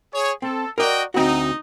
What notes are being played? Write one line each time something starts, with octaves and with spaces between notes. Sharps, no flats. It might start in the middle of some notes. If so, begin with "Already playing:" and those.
G#4 C#5
C4 A4
F#4 A#4 D5 D#5 G5
D2 C4 D#4 F#4